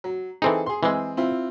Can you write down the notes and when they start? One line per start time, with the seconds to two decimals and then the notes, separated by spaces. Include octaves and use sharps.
0.04 F#3
0.42 E3 C4 D#4 G#4 A4
0.66 G#4 C6
0.83 E3 G#3 C4 G#4 E6
1.17 C4 E4 F4